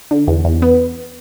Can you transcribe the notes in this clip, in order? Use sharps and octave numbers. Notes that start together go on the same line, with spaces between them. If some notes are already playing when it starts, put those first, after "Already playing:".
D3
E2
E2
B3